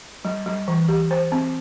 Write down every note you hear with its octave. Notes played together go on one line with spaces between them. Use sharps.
G3
G3
E3
G4
C5
C4